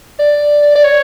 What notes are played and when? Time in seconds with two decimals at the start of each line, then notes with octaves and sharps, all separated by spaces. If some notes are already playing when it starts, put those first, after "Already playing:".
0.19 D5
0.75 D5
0.84 C#5